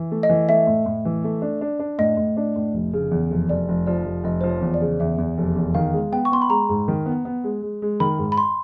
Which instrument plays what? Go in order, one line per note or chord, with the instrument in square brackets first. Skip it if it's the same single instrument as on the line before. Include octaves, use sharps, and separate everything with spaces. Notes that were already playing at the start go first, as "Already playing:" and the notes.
Already playing: [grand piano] E3
A3
[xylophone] D#5
[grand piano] E3
[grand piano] A3 [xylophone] E5
[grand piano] A2
A2
E3
A3
D4
D4
D4
[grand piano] A2 [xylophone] D#5
[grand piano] A2
D4
A2
F1
C#3
E2
F1
[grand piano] F1 [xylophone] D5
[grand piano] F1
[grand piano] F3 [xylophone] D5
[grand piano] F1
[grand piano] F1 [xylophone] D#5
[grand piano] F3 [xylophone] C5
[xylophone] C#5
[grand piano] E2
[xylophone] D5
[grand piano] C#3
[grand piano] E2 [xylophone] E5
[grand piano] E2
F1
E2
[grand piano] D#3 [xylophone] F5
[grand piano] G#3
[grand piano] B3 [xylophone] G5
[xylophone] C#6
[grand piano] B3 [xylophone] C6
[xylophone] B5
[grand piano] G#3 [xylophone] A#5
[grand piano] G#2
D#3
B3
B3
G#3
G#3
G#3
[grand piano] D#3 [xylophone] B5
[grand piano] G#2
[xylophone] B5
C6